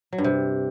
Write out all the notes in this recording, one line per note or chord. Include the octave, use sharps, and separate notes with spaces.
F#3
G2
C3